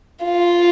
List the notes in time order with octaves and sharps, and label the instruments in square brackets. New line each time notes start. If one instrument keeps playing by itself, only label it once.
[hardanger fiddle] F4